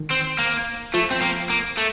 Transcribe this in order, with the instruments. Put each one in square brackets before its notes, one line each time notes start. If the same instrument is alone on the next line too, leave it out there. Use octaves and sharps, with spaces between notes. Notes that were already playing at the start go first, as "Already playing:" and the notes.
Already playing: [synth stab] D#3
[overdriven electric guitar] C4
A#3
[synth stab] F3 [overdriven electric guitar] A3
[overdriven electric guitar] C4
A#3
A#3
A3